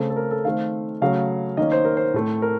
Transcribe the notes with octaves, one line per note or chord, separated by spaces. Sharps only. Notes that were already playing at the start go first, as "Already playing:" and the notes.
Already playing: C#3 A3 C4 A4
A4
A#4
A4
D#3 A3 C4 F5
C#3 F#3 A3 C#4 F5
D#3 A#3 C#4 D#5
C5
A#4
C5
A2 A3 C4
A#4